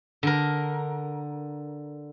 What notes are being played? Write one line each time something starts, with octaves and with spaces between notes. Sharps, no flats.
D3 A#4